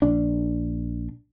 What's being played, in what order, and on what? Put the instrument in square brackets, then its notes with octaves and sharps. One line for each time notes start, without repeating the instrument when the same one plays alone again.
[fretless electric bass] A#1 D4